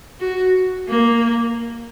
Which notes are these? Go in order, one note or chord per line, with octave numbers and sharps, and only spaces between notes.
F#4
A#3